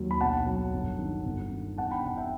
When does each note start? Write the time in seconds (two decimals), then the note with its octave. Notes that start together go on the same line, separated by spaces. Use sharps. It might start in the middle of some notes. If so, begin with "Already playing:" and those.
Already playing: D#2 F#3
0.11 B5
0.21 B1 F#5 A5
0.46 F#3
0.73 G1
0.99 D#3
1.25 G1
1.51 D#3
1.78 E1 F#5 A5
1.91 G5 B5
2.04 B2 F#5 A5
2.17 E5 G5